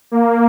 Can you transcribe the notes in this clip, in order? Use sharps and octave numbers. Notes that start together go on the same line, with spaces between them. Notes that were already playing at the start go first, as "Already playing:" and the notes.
A#3